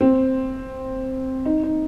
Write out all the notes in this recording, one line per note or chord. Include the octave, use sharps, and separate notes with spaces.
C4
D#4
D#4